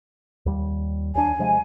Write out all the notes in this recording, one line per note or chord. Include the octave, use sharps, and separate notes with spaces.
D#2 G3
D#2 D4 G#5
C3 F3 G#3